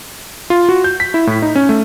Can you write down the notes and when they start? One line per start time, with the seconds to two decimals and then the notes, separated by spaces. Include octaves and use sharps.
0.50 F4
0.69 F#4
0.84 G6
1.00 B6
1.14 E4
1.27 A2
1.42 D#4
1.55 C#4
1.69 A3